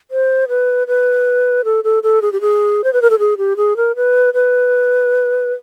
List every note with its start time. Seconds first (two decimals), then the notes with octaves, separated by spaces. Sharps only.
0.11 C5
0.48 B4
0.87 B4
1.64 A4
1.84 A4
2.03 A4
2.22 G#4
2.32 G4
2.41 G#4
2.84 C5
2.93 B4
3.02 A#4
3.10 A4
3.19 G#4
3.38 G4
3.57 G#4
3.77 A#4
3.96 B4
4.34 B4